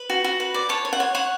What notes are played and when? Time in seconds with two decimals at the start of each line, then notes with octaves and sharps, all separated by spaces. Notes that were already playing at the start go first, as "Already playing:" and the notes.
Already playing: B4
0.10 F#4
0.24 F#4
0.40 B4
0.54 D5
0.69 C#5 A5
0.85 C#5
0.93 F#5
1.00 C#5
1.15 C#5 F#5